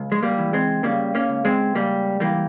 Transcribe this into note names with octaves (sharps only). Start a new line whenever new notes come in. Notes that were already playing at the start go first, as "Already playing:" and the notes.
Already playing: C#2
G#3
G3 A#3
E3
G#3 C4
C#3 G3 A#3
A#3 C#4
C#2
G#3 C4
C#2 G3 A#3
E3 G3 A#3